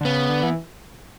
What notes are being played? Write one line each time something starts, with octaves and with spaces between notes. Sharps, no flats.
D3
C#3 B3
D3
E3